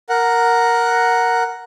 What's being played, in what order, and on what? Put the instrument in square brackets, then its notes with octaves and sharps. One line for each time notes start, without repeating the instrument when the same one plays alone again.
[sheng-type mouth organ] A#4 F#5